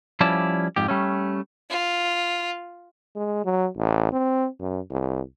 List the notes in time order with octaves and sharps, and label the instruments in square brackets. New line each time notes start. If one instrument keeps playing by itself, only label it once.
[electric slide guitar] F3 G3 C#4 E4 D5 A5
F2 G#2 G4
G3 A3 C#4
[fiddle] F4
[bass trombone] G#3
F#3
A1
C4
F#2
C2